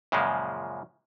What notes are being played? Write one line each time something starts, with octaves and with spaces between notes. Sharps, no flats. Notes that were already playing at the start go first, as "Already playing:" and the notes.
F#2 A#2 C#3 F3 G#3